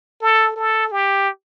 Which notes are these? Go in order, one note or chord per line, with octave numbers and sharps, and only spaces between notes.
A4
A4
G4